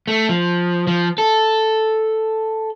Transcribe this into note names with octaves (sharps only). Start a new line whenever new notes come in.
A3
F3
F3
A4